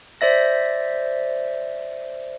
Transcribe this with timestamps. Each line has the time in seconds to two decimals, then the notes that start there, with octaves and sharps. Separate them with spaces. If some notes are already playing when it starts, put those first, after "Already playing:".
0.21 C5 D5 E5 A#6